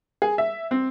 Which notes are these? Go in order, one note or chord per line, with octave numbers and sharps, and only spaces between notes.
G#4
E5
C4